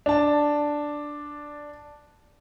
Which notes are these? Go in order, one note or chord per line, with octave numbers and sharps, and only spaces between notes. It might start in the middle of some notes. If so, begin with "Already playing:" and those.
D4 A5